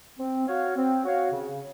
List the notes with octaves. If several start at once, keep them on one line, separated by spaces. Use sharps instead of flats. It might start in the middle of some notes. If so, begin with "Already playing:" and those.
C4
F#4 C#5 F5
C4
F#4 C#5 F5
C#3